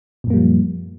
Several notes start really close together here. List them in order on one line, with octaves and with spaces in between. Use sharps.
A#2 F#2 A#3 G3 F3